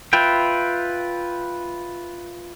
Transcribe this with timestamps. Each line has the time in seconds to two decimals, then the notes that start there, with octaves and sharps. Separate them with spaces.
0.13 F4 B4 E5 G5